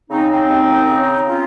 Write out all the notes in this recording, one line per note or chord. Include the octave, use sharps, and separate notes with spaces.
C#3 C4 D#4
C4 D#4
D#2
C#3
C#4 F4